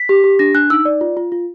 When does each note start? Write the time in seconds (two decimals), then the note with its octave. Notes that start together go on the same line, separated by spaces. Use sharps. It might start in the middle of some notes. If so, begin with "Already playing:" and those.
Already playing: B6
0.09 G4
0.24 G4
0.39 D4 A#6
0.54 D4 F#6
0.70 D#4 E6
0.85 D5
1.01 F4
1.17 F4
1.32 F4